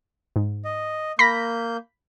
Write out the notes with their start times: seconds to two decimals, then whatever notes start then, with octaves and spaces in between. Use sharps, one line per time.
0.36 G#2
0.65 D#5
1.19 A#3 B5 G6 A#6 B6